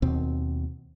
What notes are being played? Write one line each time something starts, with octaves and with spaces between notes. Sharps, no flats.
D#2 B2 C4